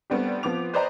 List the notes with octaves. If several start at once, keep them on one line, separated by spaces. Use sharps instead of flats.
G3 A3 B3 C4 D4 G4
F3 B3 C4 D6 F7
B4 C5 D5 D#5 G5 A#5